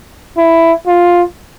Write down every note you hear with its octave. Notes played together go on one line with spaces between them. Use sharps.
E4
F4